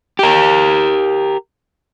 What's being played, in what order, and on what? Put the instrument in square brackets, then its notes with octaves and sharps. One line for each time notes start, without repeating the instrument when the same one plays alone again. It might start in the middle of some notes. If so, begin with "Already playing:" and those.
[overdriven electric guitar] G4 A#4